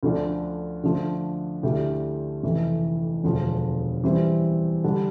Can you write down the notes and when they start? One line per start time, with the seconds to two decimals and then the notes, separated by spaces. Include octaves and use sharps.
0.03 D2 D3 F3 A3 D4
0.84 D3 F3 A3
1.63 D2 D3 A3 E4 G4
2.43 F1 F2 E3 A3
3.24 E1 D2 D3 F3
4.04 E3 G3 C4
4.84 D3 G3 D4